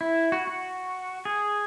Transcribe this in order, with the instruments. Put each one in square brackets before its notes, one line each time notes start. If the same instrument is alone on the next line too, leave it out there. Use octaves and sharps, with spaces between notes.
[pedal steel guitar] E4
F#4
F#4
G#4